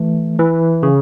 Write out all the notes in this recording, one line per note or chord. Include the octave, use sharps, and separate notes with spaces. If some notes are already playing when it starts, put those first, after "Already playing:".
Already playing: E3 A3
E3
C#3